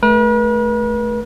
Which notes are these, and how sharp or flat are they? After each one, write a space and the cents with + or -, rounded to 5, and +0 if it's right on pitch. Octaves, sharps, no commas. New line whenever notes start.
A3 -20 B4 -45